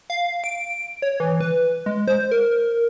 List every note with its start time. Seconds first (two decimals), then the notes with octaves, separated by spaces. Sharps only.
0.10 F5
0.44 D7
1.02 C#5
1.20 E3
1.41 B4
1.86 G#3
2.07 C5
2.31 A#4